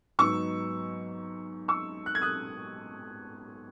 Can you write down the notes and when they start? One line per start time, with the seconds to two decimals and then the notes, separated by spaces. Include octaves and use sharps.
0.19 G#2 F#3 B3 D#4 C#6 E6
1.68 C#6 E6
2.06 F#6
2.15 G#6
2.22 D#6 F#6